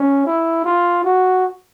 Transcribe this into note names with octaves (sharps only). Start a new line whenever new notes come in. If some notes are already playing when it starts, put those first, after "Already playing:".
Already playing: C#4
E4
F4
F#4